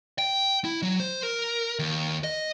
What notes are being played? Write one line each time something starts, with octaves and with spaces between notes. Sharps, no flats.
G5
E4
F#3
C5
A#4
D#2
D#5